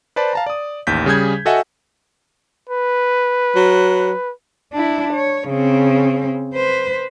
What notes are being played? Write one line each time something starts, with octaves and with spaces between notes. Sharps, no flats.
B4 C5 D5 A5 B5
F5 A5 A#5
D5 D#6
A1 D#2 G6 B6
C#3 G3 G#4 G6 G#6
F#4 A4 D#5 E5 F#5 G#5
B4
F#3
D4 E4
C#5
C#3 C4
B4 C5